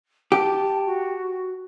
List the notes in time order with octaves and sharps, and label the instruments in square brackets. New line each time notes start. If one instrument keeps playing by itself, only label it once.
[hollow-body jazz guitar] G4 [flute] A5
[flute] F#4